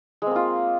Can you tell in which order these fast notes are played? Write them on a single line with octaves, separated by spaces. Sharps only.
G#3 C4 A#3 F4